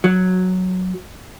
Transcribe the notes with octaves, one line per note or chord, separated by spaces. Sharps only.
F#3